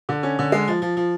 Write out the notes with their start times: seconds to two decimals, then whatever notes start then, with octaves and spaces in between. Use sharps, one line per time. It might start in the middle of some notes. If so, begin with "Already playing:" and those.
0.09 D3
0.23 C#4
0.39 D3
0.52 G#3
0.68 F3
0.82 F3
0.97 F3